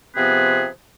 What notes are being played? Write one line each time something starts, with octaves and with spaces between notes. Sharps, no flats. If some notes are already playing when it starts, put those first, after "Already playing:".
C3 F3 B3 C4 G#4 B4